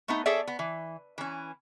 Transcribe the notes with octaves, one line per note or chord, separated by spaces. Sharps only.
A3 B3 D#4
G#4 A4 C#5 D5 E5
B3
E3
E3 C#4